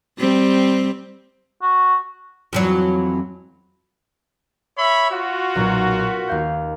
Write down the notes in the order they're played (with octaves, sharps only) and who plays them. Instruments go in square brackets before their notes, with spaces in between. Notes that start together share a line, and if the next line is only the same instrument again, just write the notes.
[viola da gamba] G3 C4
[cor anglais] F#4
[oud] F2 E3 F#3
[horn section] C#5 E5 B5
F4 F#4
[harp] B1 A#2 C#4
B6 C7
D#2 F5 G6